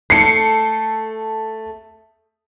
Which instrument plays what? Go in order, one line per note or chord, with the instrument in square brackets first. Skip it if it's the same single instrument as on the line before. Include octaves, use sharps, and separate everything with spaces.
[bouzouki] A3 A4 [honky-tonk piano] C7 C#7